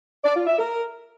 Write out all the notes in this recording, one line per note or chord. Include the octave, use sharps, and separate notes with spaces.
D5
F4
E5
A#4